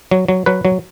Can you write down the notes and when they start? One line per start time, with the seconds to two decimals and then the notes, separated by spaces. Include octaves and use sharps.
0.11 F#3
0.28 F#3
0.46 F#3 B4
0.65 F#3